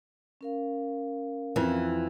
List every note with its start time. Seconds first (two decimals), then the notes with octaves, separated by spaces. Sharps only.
0.41 C#4 A#4 F5
1.56 F2 E3